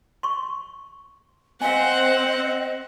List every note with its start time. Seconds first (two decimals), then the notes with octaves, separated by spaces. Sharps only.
0.23 C6 C#6
1.62 C4 C5 D#5 F5 F#5 G#5